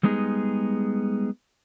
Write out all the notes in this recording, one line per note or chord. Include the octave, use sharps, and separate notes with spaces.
G3 G#3 B3 D#4 G#4